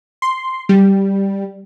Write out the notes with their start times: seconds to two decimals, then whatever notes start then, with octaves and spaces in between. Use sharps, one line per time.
0.22 C6
0.69 G3